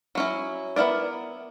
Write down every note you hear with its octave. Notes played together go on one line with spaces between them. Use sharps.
F#3 C#4 E4
B3 E4 A#4 D5